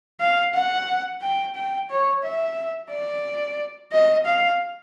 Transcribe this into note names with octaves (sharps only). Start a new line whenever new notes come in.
F5
F#5
G5
G5
C#5
E5
D5
D#5
F5